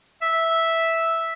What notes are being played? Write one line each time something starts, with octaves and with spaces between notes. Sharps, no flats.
E5